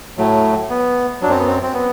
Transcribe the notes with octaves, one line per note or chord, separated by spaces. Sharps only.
A2 F#3 A3
B3
F#2 F#3 C4 D4
B3
C4
C4
B3